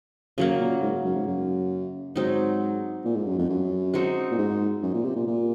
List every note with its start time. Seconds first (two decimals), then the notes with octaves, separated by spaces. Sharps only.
0.37 F#2 C#3 F#3 A#3
0.60 A#2
0.82 G#2
1.04 F#2
1.15 G#2
1.27 F#2
2.16 G#2 F#3 C4 D#4
3.05 A#2
3.15 G#2
3.26 F#2
3.38 F2
3.49 F#2
3.94 G#3 C4 D#4 F#4
4.31 A#2
4.38 G#2
4.83 F#2
4.94 A#2
5.05 C3
5.16 A#2
5.27 A#2